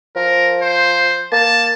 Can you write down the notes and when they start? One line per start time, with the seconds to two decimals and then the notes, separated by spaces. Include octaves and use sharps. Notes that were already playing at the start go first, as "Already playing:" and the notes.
0.16 F3 A#4
0.62 C5
1.32 A#3 A5